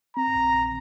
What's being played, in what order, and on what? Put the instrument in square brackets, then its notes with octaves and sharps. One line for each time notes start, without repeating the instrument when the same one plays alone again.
[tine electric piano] C4 [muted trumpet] A#5
[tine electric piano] A#1
A#1